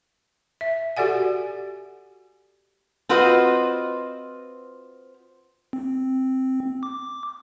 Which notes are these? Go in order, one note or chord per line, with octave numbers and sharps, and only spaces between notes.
E5
F#4 G4 A4 D5 F#5 G#5
C4 F4 F#4 B4 C5 D#5
C4
D6